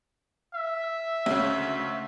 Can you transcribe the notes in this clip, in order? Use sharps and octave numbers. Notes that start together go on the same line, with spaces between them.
E5
D2 C#3